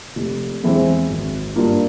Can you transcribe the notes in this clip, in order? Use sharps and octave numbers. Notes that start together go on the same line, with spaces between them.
F1
E2 E3 G#3 C4
G#1
G2 G3 A#3 F4